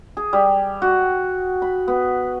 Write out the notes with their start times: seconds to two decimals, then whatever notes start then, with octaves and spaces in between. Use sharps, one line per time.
0.17 G#4
0.33 G3
0.82 F#4
1.62 B5
1.88 B3